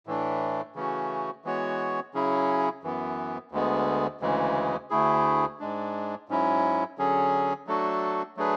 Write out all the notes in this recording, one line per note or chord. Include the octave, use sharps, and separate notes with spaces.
A2 E3 A3 D4
C#3 E3 A3 C#4 F#4
E3 G#3 B3 F#4 C#5
C#3 F#3 C#4 E4 G#4
F#2 E3 B3
D2 D3 G#3 B3
D2 C#3 E3 G#3
D2 D3 A3 E4 G#4
G#2 G#3 D4
G#2 F#3 C#4 E4
D3 F#3 C#4 G#4
F#3 A3 D4 F#4 A4
F#3 A3 D4 G#4 B4